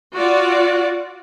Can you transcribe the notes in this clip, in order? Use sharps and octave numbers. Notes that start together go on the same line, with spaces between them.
F4 F#4 D5 F#5